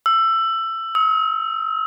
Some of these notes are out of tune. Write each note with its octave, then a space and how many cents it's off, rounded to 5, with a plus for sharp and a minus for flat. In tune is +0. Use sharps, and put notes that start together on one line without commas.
E6 +20
E6 -45